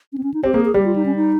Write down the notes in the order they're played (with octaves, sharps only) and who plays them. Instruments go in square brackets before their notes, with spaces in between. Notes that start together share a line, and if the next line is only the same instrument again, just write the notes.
[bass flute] C#4
C4
C#4
D#4
[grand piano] C4 [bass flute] G4
[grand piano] A#3 [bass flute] G#4
[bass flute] G#4
[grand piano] G3 [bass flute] G4
[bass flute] F4
D#4
C#4
D#4